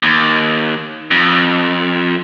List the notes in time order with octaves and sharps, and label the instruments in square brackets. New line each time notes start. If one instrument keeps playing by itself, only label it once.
[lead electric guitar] D#2
F2